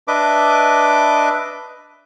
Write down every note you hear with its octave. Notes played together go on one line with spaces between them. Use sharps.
D4 B4 D#5 E5 D6